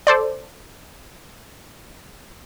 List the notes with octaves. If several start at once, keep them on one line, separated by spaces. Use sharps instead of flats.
A4 C5 D5